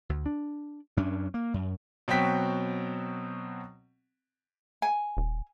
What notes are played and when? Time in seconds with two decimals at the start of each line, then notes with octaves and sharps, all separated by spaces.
0.09 D2
0.26 D4
0.97 F#2 C#4 D4
1.34 A#3
1.54 F#2
2.08 B2 F#3 C4 G5 B6
4.82 G#5
5.17 D#1